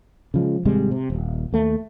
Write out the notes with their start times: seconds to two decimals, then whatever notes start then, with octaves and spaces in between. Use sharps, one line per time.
0.34 C#3 F3 G#3
0.65 G#1 C3 G3 G#3
0.91 C3
1.10 D#1
1.53 D#2 A3